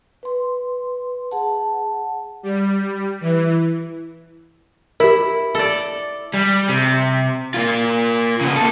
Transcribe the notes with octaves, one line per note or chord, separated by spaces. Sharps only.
B4 C6
G#4 F#5 A5
G3
E3
E4 G4 A#4
A4 D5
G3
C3
A#3 F4
C#3 B3
A#3 A4